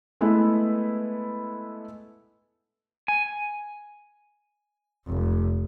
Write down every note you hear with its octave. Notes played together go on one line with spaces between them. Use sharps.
G#3 A3 B3 E4 B4
G#5
F1